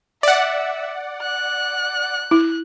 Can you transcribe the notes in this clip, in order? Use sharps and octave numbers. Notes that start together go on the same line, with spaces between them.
D5 E5 F#5
F#6
E4